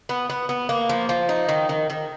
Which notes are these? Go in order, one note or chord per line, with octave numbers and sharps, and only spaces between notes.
B3
B3
B3
A#3
F3
F3
D#4
D#3
D#3
D#3